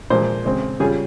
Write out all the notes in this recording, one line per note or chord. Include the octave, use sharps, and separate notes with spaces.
A#2 F3 G#3 C5
C#3 G#3 C4
C#3 G3 C#4 F4 G#4